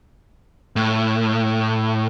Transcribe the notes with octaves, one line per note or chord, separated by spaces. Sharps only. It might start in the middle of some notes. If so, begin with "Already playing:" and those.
A2